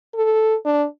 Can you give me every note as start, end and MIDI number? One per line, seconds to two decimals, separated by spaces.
0.15 0.55 69
0.65 0.86 62